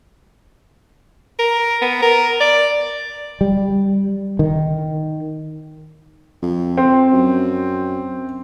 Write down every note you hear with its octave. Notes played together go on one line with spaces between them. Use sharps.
A#4
B3
A#4
D5
G3
D#3
F2
C4
F#2